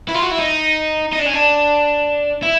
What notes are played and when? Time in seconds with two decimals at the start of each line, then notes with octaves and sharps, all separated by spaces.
0.09 E4
0.15 F4
0.22 F#4
0.31 E4
0.39 D#4
1.13 D#4
1.20 D4
1.26 C#4
1.34 D4
2.43 E4